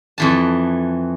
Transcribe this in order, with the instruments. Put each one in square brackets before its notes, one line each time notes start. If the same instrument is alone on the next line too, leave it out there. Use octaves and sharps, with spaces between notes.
[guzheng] F2 E3 A5